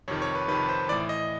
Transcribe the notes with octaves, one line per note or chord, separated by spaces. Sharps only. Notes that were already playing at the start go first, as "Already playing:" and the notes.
F2 C3 D#3 C#5
C#5
B4
F2 C3 D#3 B4
C5
A2 E3 D5
D#5